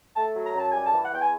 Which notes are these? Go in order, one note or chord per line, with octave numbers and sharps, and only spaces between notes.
A3 A5
F#3
A#5
F#2 A5
G3 G#5
A5
E3
F#5
E2 G5
G#5